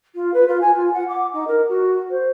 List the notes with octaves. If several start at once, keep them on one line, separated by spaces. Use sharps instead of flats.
F4
B4
F4
G#5
F4
F#5
D6
D#4
A#4
F#4
C5